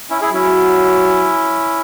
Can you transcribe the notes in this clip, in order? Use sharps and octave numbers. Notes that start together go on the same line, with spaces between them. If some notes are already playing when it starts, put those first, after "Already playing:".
C#4 E4
E4 G#4
F#3 C#4 E4